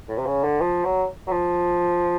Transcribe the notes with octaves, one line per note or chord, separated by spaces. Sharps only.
A2
C3
C#3
D3
F3
F#3
F#3
F3